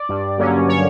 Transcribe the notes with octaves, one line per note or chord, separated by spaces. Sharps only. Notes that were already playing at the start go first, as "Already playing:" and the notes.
Already playing: D5
G2
D3 F#3 A#3 C#4
C#5